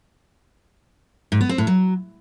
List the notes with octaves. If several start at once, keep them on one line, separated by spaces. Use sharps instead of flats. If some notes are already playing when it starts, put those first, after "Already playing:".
G#2
B3
C4
A2
F#3